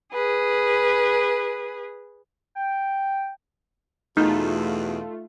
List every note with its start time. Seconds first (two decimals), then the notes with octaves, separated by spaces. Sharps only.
0.13 G#4 B4
2.56 G5
4.17 E2 B2 A3 D#4 F4